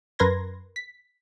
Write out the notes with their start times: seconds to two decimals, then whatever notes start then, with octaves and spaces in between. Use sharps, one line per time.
0.19 F#2 A#4 B4 C6 G#6 A#6
0.76 B6